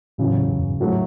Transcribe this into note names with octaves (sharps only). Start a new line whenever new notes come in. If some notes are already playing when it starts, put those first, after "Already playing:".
E2 A2 C#3 F#3
G#2
F#2
G#2
A2 F#3 A3